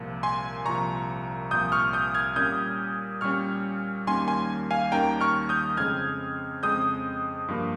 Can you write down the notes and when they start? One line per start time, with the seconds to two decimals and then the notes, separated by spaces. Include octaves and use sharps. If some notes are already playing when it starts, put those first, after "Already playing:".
Already playing: C2 A#2 F3
0.23 G#5 C6
0.65 C2 A#2 F3 A#5 C#6
1.51 C2 A#2 F3 D#6 G6
1.72 C#6 F6
1.93 D#6 G6
2.14 F6 G#6
2.36 A#2 G3 C#4 D#6 G6
3.21 A#2 G3 C#4 C#6 F6
4.07 D#2 D#3 G3 A#3 C#4 G#5 C6
4.28 G#5 C6
4.71 F5 G#5
4.92 D#2 D#3 G3 A#3 C#4 G5 A#5
5.21 C#6 F6
5.49 D#6 G6
5.77 F2 C#3 G#3 C4 F6 G#6
6.63 F2 C#3 G#3 C4 D#6 G6
7.48 G2 F3 A#3